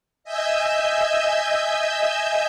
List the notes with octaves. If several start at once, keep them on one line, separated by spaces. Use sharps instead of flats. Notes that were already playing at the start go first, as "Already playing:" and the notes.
D#5 E5 G#5 E6 G6